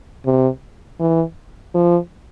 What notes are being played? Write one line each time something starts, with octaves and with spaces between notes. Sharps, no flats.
C3
E3
F3